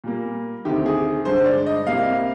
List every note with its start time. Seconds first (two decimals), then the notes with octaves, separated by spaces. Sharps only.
0.04 A#2 G3 A#3
0.65 D2 C3 D#3 G4
0.86 G#4
1.25 G2 D3 G#3 C5
1.46 D5
1.66 D#5
1.87 C2 C3 G3 A#3 F5